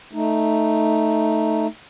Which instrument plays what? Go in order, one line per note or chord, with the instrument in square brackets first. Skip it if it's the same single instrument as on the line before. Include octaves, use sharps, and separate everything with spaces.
[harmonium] A3 D#4